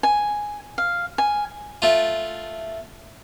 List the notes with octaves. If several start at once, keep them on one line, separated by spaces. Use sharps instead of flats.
G#5
F5
G#5
A3 F4